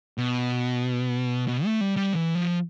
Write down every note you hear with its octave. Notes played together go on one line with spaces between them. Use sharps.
B2
B2
A3
G3
G3
E3
F3